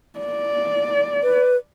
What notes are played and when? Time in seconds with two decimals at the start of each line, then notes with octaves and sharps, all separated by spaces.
0.19 D5
1.23 B4